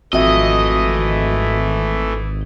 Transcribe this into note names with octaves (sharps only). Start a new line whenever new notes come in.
G#1 F2 E3 A3 F#4 D#5 E5